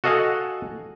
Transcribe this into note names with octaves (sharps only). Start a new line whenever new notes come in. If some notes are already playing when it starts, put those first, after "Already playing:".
F#4 A4 D#5 F5 F#5 G#5